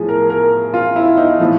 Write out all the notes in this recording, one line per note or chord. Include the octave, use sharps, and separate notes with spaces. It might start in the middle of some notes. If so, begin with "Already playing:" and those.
Already playing: A2 F3 G#4
A#4
A#4
F4
E4
D#4
A2 F3